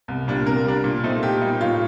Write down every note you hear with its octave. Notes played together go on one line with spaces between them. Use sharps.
C2
A#2 G3 D4
C3 A#4
G3 D4
A#2
A3 C4 D#4
A#2 G4
G3 A#3 D#4
A2 F4